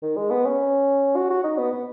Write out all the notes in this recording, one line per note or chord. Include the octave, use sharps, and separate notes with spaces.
D#3
G#3
B3
C#4
F#4
F#4
D#4
B3
B3